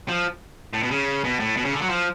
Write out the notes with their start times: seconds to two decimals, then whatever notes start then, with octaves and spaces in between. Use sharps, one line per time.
0.08 F3
0.73 A2
0.83 B2
0.91 C#3
1.24 B2
1.40 A2
1.57 B2
1.65 C#3
1.73 D3
1.81 F#3
1.89 F3